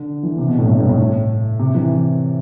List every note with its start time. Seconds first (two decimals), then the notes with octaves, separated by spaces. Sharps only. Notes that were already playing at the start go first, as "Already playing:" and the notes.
Already playing: D3
0.23 E3
0.38 C3
0.48 B2
0.59 A2
0.69 G2
0.79 A2
0.89 A2
1.59 C3
1.75 E3